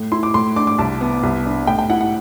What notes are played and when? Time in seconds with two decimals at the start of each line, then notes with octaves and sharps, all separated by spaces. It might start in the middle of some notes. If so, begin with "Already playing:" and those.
Already playing: A2
0.12 E4 C6
0.23 D6
0.34 A2 C6
0.56 D4 D6
0.67 D6
0.78 C2 A5
1.01 B3
1.23 C2
1.46 D4
1.67 A2 G5
1.79 G5
1.90 E4 F#5
2.01 F#5